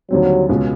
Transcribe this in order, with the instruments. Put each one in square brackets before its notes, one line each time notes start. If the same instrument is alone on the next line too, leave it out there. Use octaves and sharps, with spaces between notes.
[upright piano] D#2 D3 G3 C4 [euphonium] F#3
[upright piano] C#2 B2 G#3 C#4 F4